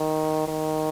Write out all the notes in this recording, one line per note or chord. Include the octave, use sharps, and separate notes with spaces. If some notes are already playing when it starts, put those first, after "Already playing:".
Already playing: D#3
D#3